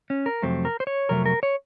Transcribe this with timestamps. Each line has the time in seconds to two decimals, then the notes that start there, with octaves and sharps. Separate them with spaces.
0.10 C#4
0.26 A#4
0.42 F2 C3 F#3 A3 C4
0.65 A#4
0.80 C5
0.87 C#5
1.09 F2 C3 F#3 A3 A#4
1.26 A#4
1.43 C#5